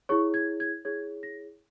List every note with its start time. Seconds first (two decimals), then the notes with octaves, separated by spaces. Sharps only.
0.09 E4 G#4 C#5 C#6
0.34 G#6
0.60 G#6
0.85 E4 G#4 C#5 G#6
1.23 A#6